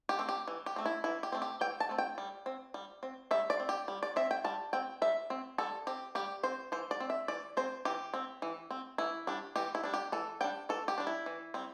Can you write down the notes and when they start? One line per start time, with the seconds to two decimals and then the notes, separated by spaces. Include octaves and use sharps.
0.09 G4
0.19 A3 C4
0.29 G4
0.48 E3
0.66 G4
0.76 A3 C4
0.86 E4
1.04 E3 E4
1.23 G4
1.32 A3 C4
1.42 G4
1.61 E3 G5
1.80 A5
1.89 A3 C4
1.98 G5
2.18 G3
2.46 C4
2.74 G3
3.03 C4
3.31 G3 E5
3.50 D5
3.60 C4
3.69 G4
3.88 G3
4.03 D5
4.16 C4 E5
4.31 G5
4.44 G3 A5
4.73 C4 G5
5.02 G3 E5
5.30 C4
5.58 G3 A4
5.87 C4 G4
6.15 G3 G4
6.43 C4 C5
6.72 E3 C5
6.91 D5
7.00 C4
7.10 E5
7.28 E3 D5
7.57 C4 C5
7.85 E3 G4
8.14 C4
8.42 E3
8.71 C4
8.98 E3 E4
9.27 G3 D4
9.56 E3 G4
9.75 E4
9.84 G3 D4
9.94 G4
10.12 E3 A4
10.41 G3 D4 G5
10.69 E3 A4
10.88 G4
10.98 G3 D4
11.07 E4
11.26 E3
11.54 G3 C4